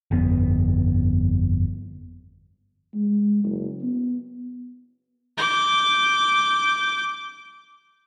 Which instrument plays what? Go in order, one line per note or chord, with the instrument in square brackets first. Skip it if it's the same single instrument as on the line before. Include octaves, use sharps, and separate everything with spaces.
[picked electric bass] G1 F2 B3
[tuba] G#3
F#1
B3
[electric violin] D6 G6